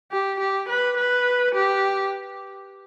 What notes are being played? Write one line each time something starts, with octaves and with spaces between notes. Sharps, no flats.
G4
G4
B4
B4
G4